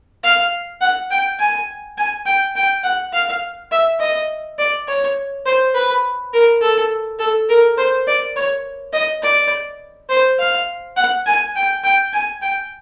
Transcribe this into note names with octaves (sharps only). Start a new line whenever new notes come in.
F5
F#5
G5
G#5
G#5
G5
G5
F#5
F5
E5
D#5
D5
C#5
C5
B4
A#4
A4
A4
A#4
C5
D5
C#5
D#5
D5
C5
F5
F#5
G#5
G5
G5
G#5
G5